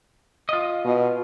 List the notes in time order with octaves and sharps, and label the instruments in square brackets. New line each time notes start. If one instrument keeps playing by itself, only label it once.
[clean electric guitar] F4 D#5
[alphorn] B2